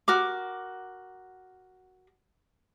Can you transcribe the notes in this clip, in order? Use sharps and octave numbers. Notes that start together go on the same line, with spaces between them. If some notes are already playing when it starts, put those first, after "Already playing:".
F#4 A#4 D6